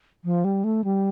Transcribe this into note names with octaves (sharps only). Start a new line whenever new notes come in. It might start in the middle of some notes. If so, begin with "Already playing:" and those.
F3
G3
A3
G3